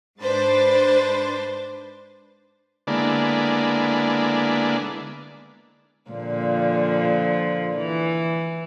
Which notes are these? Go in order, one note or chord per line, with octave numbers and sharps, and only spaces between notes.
G#2 D4 B4 C5 A6
D3 G#3 A#3 B3 D4 E4
A#2 D3 F3
E3